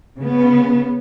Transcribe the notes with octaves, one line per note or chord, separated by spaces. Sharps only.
C#3 B3